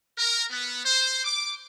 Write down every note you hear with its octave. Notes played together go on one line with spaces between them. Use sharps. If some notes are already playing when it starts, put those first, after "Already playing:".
A#4
B3
C5
D6